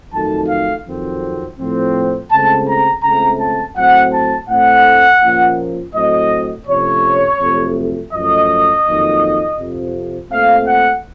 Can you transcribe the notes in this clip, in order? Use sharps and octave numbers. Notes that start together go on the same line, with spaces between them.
F2 D#3 F#3 A3 A5
F5
F2 D#3 F#3 C4
A2 F3 C4
C#2 C#3 A3 C4 A5
A#5
C#2 C#3 A3 C4 A#5
A5
A2 F#3 C4 F#5
A5
A2 A3 C4 F#5
A#2 F3 A#3 C#4
A2 F#3 C4 D#5
C3 F3 A3 C#4 C#5
F2 C3 F#3 A3
F#2 F3 A3 C#4 D#5
F2 D#3 F#3 A#3
F2 C3 F3
A#2 A3 C4 F5
F#5